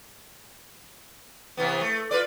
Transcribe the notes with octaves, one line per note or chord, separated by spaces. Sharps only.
C3 E3 B3
A3
F4 B4 D5